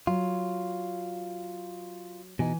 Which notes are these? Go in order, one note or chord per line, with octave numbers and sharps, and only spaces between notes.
F#3 F4
B2 E3 D#4 G#5